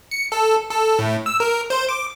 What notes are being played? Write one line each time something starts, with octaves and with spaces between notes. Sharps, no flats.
C#7
A4
A4
A2
E6
A#4
C5
D6